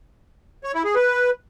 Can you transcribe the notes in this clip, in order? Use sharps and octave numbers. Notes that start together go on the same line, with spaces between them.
C#5
E4
G#4
B4